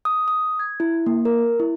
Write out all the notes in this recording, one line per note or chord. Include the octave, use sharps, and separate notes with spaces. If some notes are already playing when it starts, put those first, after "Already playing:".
D#6
D#6
G#6
E4
A#3
A#4
E4